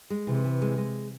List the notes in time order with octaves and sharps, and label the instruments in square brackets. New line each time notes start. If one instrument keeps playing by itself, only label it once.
[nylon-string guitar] G#3
[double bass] C3 [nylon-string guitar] E3
[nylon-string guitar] E3
G#3
G#3